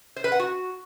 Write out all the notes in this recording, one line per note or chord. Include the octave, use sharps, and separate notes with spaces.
C5
B4
F#5
F#4